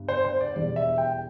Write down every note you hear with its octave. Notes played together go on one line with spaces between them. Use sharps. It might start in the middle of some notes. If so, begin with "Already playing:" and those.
Already playing: G1 G2
C5
C5
D5
E1 E2 E3 G3 D5
E5
G5